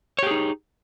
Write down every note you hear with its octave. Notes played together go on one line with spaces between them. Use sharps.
D#4 G4 G#4 C#5